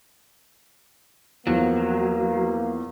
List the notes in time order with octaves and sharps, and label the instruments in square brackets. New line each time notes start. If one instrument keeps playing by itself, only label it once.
[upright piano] E2 F3 [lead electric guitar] F#3 [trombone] A#3